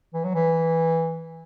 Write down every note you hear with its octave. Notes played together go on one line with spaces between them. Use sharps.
E3
F#3
E3